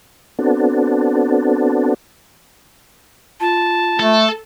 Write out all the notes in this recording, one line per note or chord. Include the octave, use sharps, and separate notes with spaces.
B3 C4 D4 F#4 A4
F4 A5
A3 A4